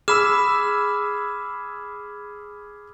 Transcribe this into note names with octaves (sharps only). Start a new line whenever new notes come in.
G#4 B5 D6 E6 F6 E7